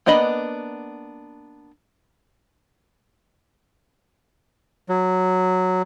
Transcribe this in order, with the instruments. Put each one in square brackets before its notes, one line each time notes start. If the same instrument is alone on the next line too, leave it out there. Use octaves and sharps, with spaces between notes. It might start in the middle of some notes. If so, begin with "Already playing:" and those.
[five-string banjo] A#3 B3 D4 D#5 B5
[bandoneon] F#3